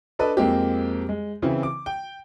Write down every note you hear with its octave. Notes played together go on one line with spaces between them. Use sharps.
D4 A4 B4 D#5
F2 G#3 A#3 C4 G4
G#3
C#3 E3 C4 E4
D6
G5